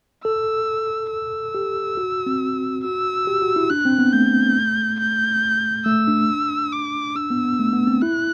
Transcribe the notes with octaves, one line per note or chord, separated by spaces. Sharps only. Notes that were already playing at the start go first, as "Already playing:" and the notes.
A4 E6
E6
G4
F#4
C4
F#4 E6
G4
F#4
E4
D4 F#6
C4
B3
A3 G6
G6
A3 E6
D4
D6
D4 E6
B3
B3
A3
B3
C4
E4 F#6